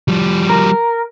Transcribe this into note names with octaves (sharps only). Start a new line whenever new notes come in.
F3 G3
A#4